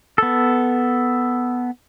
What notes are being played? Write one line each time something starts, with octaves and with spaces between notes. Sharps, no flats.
B3 A4